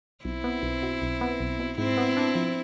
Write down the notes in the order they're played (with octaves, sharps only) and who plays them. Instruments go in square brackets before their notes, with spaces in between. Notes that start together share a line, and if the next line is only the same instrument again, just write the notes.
[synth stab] B1 [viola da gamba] C4 E4
[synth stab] B3
B1
B2
B1
B3
B1
B2
[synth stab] G#2 [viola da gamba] C4 E4
[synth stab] B3
D4
F3